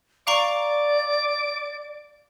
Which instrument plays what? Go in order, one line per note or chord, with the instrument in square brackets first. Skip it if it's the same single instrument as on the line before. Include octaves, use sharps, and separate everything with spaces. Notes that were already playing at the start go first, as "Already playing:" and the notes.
[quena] D5 [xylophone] F5 A#5 C#6 [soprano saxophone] D6